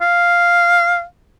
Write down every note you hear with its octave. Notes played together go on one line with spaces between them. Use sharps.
F5